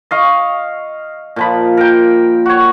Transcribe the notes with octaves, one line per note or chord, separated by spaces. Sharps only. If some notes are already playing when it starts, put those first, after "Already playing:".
D#5 F5 C#6
A#2 F3 B5
A#4 G5
F#4 C#5